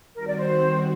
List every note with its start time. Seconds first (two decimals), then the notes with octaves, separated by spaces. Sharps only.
0.15 D#3 G3 C4 F#4 A#4
0.27 D5
0.38 C5